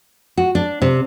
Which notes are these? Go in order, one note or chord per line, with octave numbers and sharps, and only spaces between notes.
F#4
D4
C3